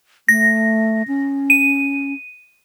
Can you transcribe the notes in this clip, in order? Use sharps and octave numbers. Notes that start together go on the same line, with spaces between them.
A3 A#6
C#4
D#7